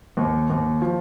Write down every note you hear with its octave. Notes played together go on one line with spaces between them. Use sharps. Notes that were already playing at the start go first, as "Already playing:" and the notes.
D#2
D#2
F3